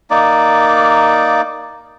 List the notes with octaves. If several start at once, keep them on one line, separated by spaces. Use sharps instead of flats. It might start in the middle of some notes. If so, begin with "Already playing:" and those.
A#3 D#4 D5